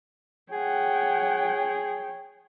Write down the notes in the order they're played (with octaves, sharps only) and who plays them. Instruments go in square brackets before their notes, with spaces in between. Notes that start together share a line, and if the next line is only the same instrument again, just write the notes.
[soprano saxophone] G#4 [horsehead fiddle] C#5 G5 [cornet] F#5